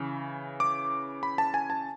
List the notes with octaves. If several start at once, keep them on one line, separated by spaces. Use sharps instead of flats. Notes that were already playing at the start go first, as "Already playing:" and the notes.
Already playing: C#3 E3
D6
B5
A5
G#5
A5